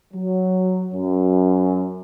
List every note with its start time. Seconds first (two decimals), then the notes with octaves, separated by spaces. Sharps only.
0.13 F#3
0.93 F#2